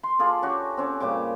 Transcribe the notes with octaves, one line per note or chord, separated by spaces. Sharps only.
C6
F4 G#4 A4 D5
C#4 F#4 G4
C4 C#4 D5
A#2 C#3 G3 D6